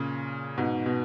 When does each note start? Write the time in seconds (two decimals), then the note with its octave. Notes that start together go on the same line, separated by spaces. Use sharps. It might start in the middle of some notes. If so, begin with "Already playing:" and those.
Already playing: A#2 C#3
0.58 G#2 B2
0.86 B2